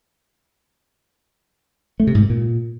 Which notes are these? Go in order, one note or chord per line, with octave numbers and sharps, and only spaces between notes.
A3
C3
G#2
B2
A#2